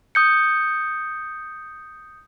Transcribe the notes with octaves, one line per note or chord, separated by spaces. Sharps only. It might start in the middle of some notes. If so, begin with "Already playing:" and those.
D#6 G6 C#7